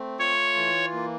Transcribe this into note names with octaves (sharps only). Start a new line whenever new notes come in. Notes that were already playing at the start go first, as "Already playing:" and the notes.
Already playing: A3 C4
F4 C#5
E3
A#3